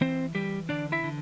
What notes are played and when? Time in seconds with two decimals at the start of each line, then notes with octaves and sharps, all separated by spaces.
0.01 E3 C4 C5
0.35 E3 G3 G4
0.69 D3 D4 D5
0.92 E4 E5
1.04 D3